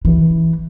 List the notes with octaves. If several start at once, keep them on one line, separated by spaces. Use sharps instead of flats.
E3